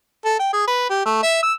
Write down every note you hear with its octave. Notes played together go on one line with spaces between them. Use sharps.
A4
G5
G#4
B4
G4
A3
E5
E6